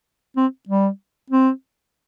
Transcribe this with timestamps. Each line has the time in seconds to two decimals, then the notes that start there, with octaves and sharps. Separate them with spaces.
0.37 C4
0.69 G3
1.31 C4